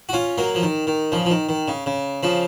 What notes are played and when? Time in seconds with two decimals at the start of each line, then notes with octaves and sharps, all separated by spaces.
0.09 F#4
0.13 C#4 F4
0.38 F#3 A#3
0.55 F3
0.63 D#3
0.87 D#3
1.12 C#3 F3
1.25 F3
1.30 D#3
1.49 D#3
1.68 C#3
1.86 C#3
2.23 C#3 F3